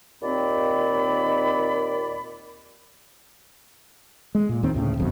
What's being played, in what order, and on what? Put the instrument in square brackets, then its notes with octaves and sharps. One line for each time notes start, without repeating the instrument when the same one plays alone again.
[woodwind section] D#2 A#2 D#3 C4 D5 B5
[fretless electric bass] G#3
A#2
D#2 D#3 C4
D2 A2 C#3
G1 F2 B2